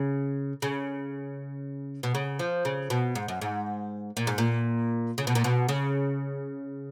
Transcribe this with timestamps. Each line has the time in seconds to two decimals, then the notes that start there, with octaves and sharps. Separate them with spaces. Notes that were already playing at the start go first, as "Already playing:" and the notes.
Already playing: C#3
0.62 C#3
2.03 B2
2.15 C#3
2.39 F3
2.65 C#3
2.90 B2
3.15 G#2
3.28 F#2
3.42 G#2
4.17 A#2
4.27 G#2
4.38 A#2
5.18 C#3
5.27 B2
5.35 A#2
5.44 B2
5.69 C#3